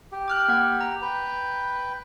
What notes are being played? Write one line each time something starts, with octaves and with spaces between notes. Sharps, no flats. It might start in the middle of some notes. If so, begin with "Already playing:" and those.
G4
D6 F6 F#6
A#3 F#5
A#5
B4 G5